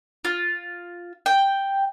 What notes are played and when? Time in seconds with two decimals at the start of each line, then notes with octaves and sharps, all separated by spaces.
0.25 F4
1.26 G5